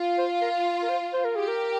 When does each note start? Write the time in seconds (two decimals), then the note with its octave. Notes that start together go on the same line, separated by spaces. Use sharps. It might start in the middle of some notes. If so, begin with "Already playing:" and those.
Already playing: F4
0.18 C5
0.41 A#4
0.82 A#4
0.89 C5
1.13 C5
1.24 A#4
1.36 G4 G#4
1.48 A#4